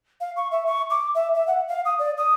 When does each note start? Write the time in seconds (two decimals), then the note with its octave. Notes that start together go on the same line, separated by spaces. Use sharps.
0.21 F5
0.36 C#6
0.51 E5
0.66 C#6
0.90 D6
1.15 E5
1.35 E5
1.47 F#5
1.68 F5
1.85 D#6
1.99 D5
2.18 D#6